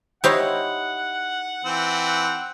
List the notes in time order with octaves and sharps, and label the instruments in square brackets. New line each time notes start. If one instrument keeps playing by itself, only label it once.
[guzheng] D#4 E4 [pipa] G4 C5 C#5 [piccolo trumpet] F#5
[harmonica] E3 C4